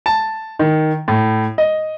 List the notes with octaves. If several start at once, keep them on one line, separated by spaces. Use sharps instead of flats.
A5
D#3
A2
D#5